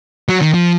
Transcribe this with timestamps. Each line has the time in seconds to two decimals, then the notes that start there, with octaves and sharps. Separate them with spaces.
0.29 F#3
0.41 D#3
0.54 F3